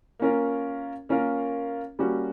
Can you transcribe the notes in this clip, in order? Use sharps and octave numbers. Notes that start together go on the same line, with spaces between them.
A#3 C#4 F4 A#4
A#3 C#4 F4 A#4
G3 A#3 C#4 F#4